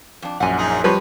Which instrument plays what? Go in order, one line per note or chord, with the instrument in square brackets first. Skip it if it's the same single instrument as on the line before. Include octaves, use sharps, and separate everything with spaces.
[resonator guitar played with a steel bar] F2 D4
[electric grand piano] A#1 F#2 [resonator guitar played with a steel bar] F#5 G#5
[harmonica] D#4 G#4
[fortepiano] F3 B4 [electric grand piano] G3 [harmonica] C#5